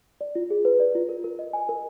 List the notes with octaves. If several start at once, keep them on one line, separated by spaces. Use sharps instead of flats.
D5
F4
G#4
B4
D5
F4
A#4
A#4
D#5
G#5
A#4